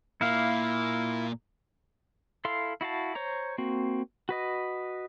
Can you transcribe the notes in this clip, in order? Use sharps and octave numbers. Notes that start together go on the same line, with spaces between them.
A#2 A#3 E4 F5
E4 A4 F5 C6
E4 F#4 F5 A5
C5 C#5 A#5
A#3 C4 F#4
F#4 B4 D#5